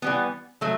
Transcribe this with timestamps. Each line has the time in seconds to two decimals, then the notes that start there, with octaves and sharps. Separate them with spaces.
0.02 E3 G3 B3
0.61 F#3 A3